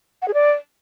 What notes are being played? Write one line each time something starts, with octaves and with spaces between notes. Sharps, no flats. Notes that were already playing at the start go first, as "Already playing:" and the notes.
F#5
G#4
D5